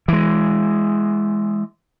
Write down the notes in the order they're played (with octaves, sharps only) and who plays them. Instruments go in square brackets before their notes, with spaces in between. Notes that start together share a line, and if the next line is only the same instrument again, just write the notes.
[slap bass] E3 G#3